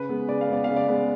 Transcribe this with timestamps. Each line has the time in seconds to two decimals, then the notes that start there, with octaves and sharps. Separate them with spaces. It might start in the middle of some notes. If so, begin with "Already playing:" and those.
Already playing: C#3 B4
0.09 G#3 B3
0.28 C#3 D5
0.41 F5
0.49 G#3 B3 D5
0.64 C#3 F5
0.76 D5
0.88 G#3 B3